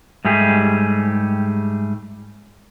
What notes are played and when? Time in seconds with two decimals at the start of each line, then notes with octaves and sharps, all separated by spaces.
0.25 G#2 G3 A3 G4 G#4